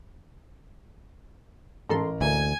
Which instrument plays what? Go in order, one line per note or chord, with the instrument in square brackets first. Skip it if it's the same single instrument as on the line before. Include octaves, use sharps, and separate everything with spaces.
[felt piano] A1 A#4 A#5 [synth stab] G#2 A4 C6
[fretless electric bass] D2 D3 [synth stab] E3 A#3 [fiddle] G#5